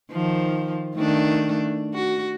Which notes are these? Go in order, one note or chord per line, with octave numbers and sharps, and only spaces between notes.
D#3 F3
D#3 A3 D4
F#4